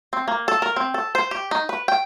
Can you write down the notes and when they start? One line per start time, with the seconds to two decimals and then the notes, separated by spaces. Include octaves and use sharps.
0.13 C4
0.28 A#3
0.48 A4
0.62 A#4
0.76 C4
0.94 A4
1.15 C5
1.31 G4
1.51 D#4
1.69 B4
1.88 G5